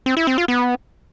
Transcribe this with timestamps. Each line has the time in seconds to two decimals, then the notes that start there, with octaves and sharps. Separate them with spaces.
0.06 C4
0.17 E4
0.27 C4
0.38 F4
0.48 B3